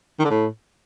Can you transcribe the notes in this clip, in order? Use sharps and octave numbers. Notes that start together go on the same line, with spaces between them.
D#3
D3
A2